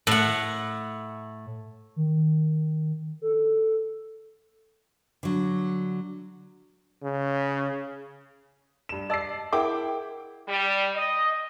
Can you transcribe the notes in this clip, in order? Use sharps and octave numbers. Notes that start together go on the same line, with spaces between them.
A2 F#5
D#3
A4
D3 F#3
C#3
G2 E7
D5 D#5 A5 E6 C7
E4 G#4 A#4 F#5 G5 D6
G3
D#5